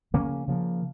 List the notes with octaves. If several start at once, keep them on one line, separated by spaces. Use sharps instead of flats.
C#3 F3 A#3 C#4
C#3 F3 A#3